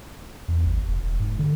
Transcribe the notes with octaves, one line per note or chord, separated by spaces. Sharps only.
E2
G#1
F1
E1
G#2
D3